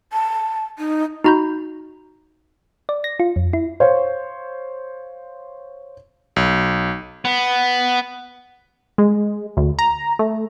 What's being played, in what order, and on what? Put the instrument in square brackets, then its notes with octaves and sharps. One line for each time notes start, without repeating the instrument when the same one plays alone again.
[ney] A5
D#4
[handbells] D#4 F#4 A#5 B5 G6
[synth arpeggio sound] D5
A#6
F4
F2
E4
[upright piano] C5 C#5 F5
[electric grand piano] B1
[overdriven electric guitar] B3
[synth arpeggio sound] G#3
D2
A#5
A3